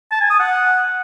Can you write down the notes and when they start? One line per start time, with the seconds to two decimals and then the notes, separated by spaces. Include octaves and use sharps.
0.11 A5
0.21 G#5
0.30 D#6
0.39 F#5